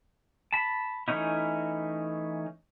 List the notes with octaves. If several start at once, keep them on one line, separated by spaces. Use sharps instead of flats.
A5 B5
E3 A3 C#4 D#4 E4